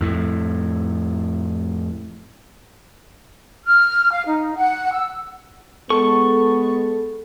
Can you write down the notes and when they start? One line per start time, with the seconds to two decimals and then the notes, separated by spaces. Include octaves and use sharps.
0.01 F2 A2
3.64 F6
4.12 F5
4.26 D#4
4.57 F#5
4.92 E6
5.90 G#3 B3 A4 C#6